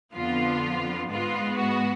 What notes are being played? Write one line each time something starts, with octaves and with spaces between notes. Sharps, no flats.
F2 D3 F3 B3 F4
G#2 G#3 B3 F4
F#4